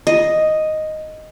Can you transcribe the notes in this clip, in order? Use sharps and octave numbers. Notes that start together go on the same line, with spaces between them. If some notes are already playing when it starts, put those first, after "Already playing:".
D#5